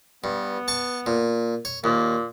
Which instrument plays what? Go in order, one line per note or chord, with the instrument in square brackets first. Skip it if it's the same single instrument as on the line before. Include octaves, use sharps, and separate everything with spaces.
[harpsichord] G2 [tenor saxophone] B3
[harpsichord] A5 C#6
A#2
C#5
[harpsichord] D#2 [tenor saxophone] A#2